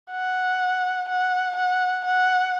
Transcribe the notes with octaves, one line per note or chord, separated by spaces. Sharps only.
F#5
F#5
F#5
F#5